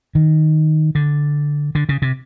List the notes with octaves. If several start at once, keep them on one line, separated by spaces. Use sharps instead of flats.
D#3
D3
D3
C#3
C3